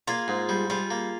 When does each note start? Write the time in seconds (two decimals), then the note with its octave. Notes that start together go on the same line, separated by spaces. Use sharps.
0.07 A#3 F4 G#4
0.28 G#2
0.49 G3
0.70 G3 F4 G#4
0.91 A#3